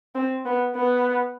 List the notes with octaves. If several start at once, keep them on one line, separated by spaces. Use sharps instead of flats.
C4
B3
B3